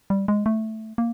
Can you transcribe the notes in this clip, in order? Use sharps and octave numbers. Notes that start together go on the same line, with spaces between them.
G3
G#3
A3
A#3